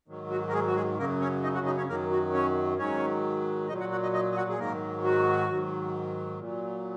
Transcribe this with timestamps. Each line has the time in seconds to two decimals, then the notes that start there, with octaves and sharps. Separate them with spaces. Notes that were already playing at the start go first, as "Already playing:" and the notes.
0.08 G#2 D#3 F#3
0.30 F#4
0.49 A#4
0.53 G#3 G#4
0.67 F#4
0.76 G#3 G#4
0.98 F#2 C#3 F#3 A#3 A#4
1.21 C#4 C#5
1.43 D#4 D#5
1.55 F#4 F#5
1.66 D#4 D#5
1.77 C#4 C#5
1.89 F#2 D#3 F#3 A#3 A#4
2.11 F#4
2.33 C#4 C#5
2.78 G#2 D#3 F#3 C#4 C#5
3.68 A#2 F#3 D#4 D#5
3.80 F#4 F#5
3.92 F#4 F#5
4.03 D#4 D#5
4.14 D#4 D#5
4.32 D#5
4.36 F#4 F#5
4.50 G#4
4.59 G#2 D#3 F#3 A#3 A#4
5.04 F#4
5.50 G#2 D#3 F#3
6.39 A#2 F#3